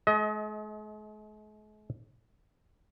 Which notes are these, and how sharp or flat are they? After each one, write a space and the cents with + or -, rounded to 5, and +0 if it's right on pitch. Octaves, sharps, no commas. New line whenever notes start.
G#3 +45 D#5 +30